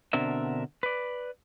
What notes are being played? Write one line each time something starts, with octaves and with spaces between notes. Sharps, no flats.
B2 D3 C4 D4 A#4 E5
B4 D5